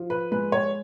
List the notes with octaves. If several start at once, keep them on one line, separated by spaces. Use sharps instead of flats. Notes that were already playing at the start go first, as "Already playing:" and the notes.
Already playing: F3
B4
G#3 B4
C#5